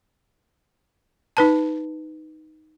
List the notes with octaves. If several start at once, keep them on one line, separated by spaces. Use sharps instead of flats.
D#4 B4 A5